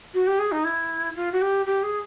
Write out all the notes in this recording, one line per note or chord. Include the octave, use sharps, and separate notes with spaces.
F#4
G4
G#4
D#4
E4
F4
F#4
G4
G4
G#4